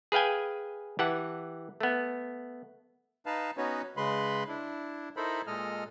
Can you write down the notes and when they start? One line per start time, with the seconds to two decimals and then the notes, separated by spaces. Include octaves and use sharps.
0.12 G#4 B4 F5 G5 G#5
0.99 E3 G4 F#5 A5
1.80 A3 B3
3.26 D#4 B4 F5 A5
3.57 B3 C#4 D#4 F#4 B4 C#5
3.97 C#3 G#3 B4 B5 C6
4.48 D4 E4
5.16 D#4 E4 A4 A#4 C5 B5
5.47 A#2 G#3 A4 D#5 F6